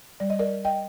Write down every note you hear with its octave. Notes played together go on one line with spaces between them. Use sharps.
G3 D5
D#5
A#4 D5
D#5 G5